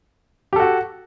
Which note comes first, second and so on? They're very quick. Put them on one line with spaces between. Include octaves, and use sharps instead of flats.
G4 A4 F#4